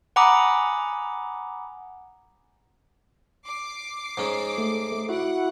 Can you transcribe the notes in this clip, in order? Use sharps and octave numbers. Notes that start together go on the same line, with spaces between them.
F#5 G#5 A#5 B5 D6 D#6
D6 C7
G#2 C#4
A3
E4 F#4 F#5